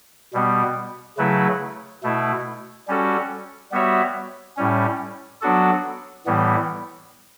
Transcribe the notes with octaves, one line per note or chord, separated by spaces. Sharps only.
B2 G3 B3
C#3 F#3 A3 E4 B4
B2 A3 E4
G3 C#4 F#4 A4
G3 B3 F#4 C#5 E5
A2 G3 C#4
F#3 B3 D4 F#4 A4
A2 E3 G3 B3